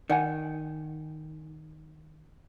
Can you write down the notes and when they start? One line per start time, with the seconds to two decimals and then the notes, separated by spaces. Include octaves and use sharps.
0.10 D#3 D5 F#5 G#5